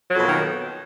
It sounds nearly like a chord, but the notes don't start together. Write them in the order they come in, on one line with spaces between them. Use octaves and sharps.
F#3 F2 B2 A#3 D#3